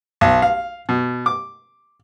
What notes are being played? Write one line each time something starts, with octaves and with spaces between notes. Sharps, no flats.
B1
F5
B2
D6